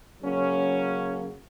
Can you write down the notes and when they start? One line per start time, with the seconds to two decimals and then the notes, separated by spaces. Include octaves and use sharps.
0.22 C#3 F#3 A#3 C#4